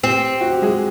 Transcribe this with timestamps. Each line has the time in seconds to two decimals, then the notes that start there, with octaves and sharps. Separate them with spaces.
0.04 C4 G4
0.41 F#4
0.53 G4
0.62 G#3 G#4